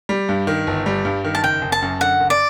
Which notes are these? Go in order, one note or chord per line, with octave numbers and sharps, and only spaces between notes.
G3
G2
D#3
G1
G3
G2
D#3
A5
F#1 G5
F#1
A5
F#2
D3 F#5
F#1
D5